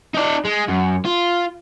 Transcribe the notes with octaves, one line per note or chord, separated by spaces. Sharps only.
D#4 D5
G#3
F#2
F4